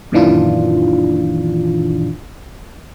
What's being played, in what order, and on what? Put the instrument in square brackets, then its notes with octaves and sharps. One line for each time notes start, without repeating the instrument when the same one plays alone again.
[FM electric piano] F#2 A#2 D#3 E3 D4 F4